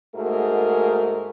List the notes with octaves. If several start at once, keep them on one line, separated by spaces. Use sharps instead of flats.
G#2 A3 A#3 F#4 G#4 A#4